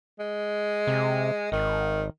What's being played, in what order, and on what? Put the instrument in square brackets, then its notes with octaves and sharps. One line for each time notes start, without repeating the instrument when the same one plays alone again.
[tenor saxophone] G#3
[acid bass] C3
[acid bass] G#1 [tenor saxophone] D#3